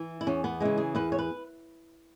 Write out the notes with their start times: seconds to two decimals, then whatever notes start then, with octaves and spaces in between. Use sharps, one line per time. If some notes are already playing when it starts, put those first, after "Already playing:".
Already playing: E3
0.21 E4
0.27 E2 C#4
0.44 B3
0.60 C#3 E3 G#3
0.78 G#4
0.95 E2 B4
1.12 C#5
1.19 B4